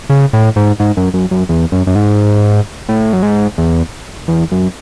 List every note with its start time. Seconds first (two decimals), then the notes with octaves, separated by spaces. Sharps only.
0.09 C#3
0.33 A2
0.56 G#2
0.80 G#2
0.97 F#2
1.14 F#2
1.31 F#2
1.49 E2
1.72 F#2
1.87 F#2
1.96 G#2
2.89 A2
3.13 F#2
3.23 G#2
3.58 E2
4.28 E2
4.51 F#2